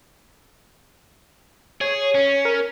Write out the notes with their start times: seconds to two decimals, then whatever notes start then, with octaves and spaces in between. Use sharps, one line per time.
1.81 G#4 C#5
2.15 C#4
2.45 A#4